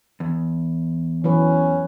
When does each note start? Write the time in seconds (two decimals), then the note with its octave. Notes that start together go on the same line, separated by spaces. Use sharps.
0.20 E2
1.24 E3 F#3 C#4 B4